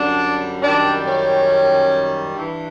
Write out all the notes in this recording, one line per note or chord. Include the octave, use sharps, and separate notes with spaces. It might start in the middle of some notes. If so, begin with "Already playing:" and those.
Already playing: F#2 D3 G3 D4
F#2 D#3 G3 D4
C#4
G2 E3